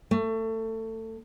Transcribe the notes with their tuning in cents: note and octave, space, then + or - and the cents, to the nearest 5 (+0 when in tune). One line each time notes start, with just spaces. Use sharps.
A3 +25